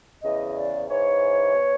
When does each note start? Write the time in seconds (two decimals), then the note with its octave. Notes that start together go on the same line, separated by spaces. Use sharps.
0.22 E2 C#3 E3 D#5
0.56 D5
0.89 G#2 E3 C#5
1.55 B2